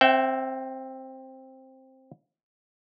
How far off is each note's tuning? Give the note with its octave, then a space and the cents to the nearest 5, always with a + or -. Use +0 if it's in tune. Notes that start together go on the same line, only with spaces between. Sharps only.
C4 +10 E5 +0 G5 -35